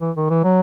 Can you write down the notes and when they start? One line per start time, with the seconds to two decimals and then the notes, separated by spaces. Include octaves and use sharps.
0.01 E3
0.16 D#3
0.30 E3
0.44 F#3